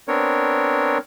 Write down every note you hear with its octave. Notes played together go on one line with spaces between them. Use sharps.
B3 C4 D4 A#4 C#5